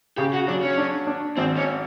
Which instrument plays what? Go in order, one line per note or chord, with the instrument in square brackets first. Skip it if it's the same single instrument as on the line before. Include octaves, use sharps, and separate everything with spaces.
[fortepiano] C#3 [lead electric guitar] G4
[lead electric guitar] F#4
[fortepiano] F#3 [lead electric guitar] D4
[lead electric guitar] C#4
[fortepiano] D4
D4
[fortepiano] G#1 [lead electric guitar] C4
[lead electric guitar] C#4